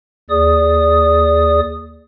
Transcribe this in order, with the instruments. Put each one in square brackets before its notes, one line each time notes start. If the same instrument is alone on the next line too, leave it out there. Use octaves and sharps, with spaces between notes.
[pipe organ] D#2 G#4 D5 D#6